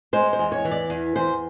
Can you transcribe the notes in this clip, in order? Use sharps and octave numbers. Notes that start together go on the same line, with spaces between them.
G#3 C5
C5
E2
C#5
E3
D5
E2
E2 C5